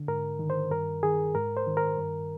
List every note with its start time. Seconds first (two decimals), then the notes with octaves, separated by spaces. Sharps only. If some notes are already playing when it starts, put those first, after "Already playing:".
Already playing: D3
0.08 G#2 A#4
0.39 D#3
0.50 C5
0.71 G2 A#4
1.03 D#3 G#4
1.35 G#2 A#4
1.57 C5
1.67 D#3
1.77 A#4
1.98 G2